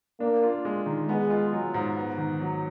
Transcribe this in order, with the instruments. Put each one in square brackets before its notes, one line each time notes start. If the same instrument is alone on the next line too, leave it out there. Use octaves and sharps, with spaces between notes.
[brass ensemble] A#3 [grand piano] D4
[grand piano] F4
G#3
D#3
[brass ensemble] G#3 [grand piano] B3
[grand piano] F4
F#3
G#2
B3
D#3
F#3